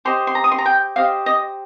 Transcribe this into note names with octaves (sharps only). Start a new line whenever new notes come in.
G4 C5 D#5 C6
C6
A#5
D#6
C6
A#5
G5
G4 C5 D#5 F5
D#5